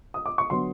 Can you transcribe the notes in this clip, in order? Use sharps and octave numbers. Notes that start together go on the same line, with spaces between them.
D#6
D6
C#6
D3 F#3 B3 C6